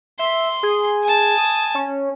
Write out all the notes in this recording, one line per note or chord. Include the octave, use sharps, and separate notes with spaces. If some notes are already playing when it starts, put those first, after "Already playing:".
E5 C6
G#4
G#5 A5
D#6
C#4